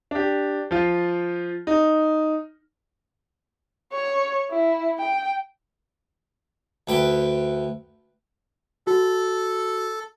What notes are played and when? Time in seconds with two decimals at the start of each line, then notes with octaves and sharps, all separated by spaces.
0.11 D4 G4
0.71 F3 F4
1.67 D#4
3.92 C#5
4.51 E4
4.99 G5
6.87 D2 B4 G5
8.87 F#4 A4